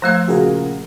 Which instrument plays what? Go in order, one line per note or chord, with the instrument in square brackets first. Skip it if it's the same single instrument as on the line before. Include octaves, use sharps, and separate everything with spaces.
[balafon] F3 A3 F5 [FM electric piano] A#5 E6 G#6
[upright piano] A#2 C#3 [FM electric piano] F#4 G#4 A#4